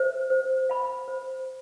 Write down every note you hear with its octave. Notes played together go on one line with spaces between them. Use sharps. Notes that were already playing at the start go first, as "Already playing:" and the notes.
Already playing: C5 E5
C5
F5 B5
C5